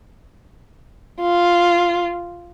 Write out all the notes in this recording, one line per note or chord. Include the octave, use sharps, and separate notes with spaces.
F4